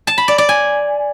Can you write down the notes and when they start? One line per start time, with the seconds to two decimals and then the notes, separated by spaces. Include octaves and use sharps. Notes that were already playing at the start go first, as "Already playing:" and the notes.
0.07 A5
0.18 B5
0.28 D5
0.38 D5
0.49 G#5